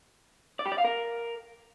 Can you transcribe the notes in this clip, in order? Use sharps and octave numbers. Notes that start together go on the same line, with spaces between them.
D5
G4
D5
F5
A#4